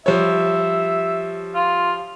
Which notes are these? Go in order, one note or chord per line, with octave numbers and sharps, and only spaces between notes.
F3 G3 C#5 E5
F4